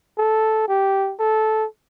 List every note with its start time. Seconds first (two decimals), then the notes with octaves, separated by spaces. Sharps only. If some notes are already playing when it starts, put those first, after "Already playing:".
0.18 A4
0.68 G4
1.20 A4